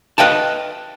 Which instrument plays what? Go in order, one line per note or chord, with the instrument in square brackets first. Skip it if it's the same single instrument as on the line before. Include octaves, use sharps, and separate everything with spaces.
[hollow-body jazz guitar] B4 D#5 F5 G5 A5